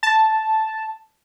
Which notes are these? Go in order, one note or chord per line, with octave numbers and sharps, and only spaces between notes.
A5